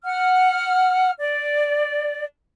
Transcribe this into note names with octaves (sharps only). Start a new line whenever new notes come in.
F#5 F6
D5